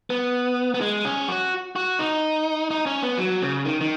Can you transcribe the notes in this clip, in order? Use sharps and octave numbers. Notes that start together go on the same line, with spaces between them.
B3
B3
G#3
C#4
F#4
F#4
D#4
D#4
C#4
B3
F#3
C#3
D#3
D#3